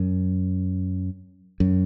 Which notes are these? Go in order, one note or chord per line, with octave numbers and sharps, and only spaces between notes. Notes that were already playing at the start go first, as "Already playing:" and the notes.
Already playing: F#2
F#2